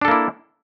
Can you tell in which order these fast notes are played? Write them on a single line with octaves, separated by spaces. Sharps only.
D4 A4 A#3 E4